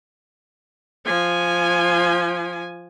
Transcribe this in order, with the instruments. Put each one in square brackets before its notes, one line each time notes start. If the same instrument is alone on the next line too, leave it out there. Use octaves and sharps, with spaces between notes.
[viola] F3 G#5